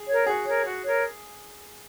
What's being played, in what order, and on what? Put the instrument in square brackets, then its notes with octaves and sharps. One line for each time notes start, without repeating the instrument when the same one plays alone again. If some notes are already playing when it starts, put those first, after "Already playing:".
Already playing: [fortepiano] G#4
[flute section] A#4 C#5
[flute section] F#4 [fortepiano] G#4
[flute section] A#4 C#5
F#4
A#4 C#5